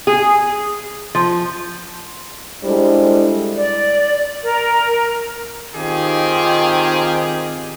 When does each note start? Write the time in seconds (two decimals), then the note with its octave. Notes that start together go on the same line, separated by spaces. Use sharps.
0.07 G#4
1.15 F3
2.64 G3 G#3 D4 E4 A4 C5
3.56 D5
4.43 A#4
5.76 D#3 C4 D#4 F4 G4 G#4